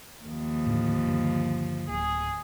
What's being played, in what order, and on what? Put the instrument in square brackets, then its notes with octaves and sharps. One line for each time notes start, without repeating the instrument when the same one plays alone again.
[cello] D#2 F3
[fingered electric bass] A2 D3
G2 D3
[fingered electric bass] D1 [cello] G#4